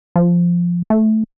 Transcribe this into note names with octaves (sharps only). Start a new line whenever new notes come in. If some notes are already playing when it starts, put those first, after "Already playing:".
F3
A3